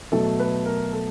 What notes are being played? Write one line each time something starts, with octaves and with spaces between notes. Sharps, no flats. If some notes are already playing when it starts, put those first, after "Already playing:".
B2 F#3 A3 A4
B4
A#4
A4